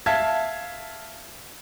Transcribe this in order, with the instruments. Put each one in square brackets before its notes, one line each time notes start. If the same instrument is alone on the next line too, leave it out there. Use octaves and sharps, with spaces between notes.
[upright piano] E5 F5 A5 G#6 B6